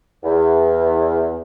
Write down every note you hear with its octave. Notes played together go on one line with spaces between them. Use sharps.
E2